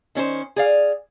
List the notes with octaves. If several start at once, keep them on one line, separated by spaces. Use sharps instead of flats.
D#3 C#4 D4 C5
G#4 D5 F5